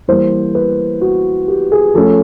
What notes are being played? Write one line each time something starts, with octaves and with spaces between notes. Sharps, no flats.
E3 G3 A#3 C5
B4
F#4
G4
G#4
F3 A3 C#4 A4